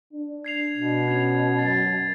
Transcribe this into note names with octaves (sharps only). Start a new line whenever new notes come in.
D4
G#6 C7 F7
B2
C#4 G#6 F7
F#2 A6 C7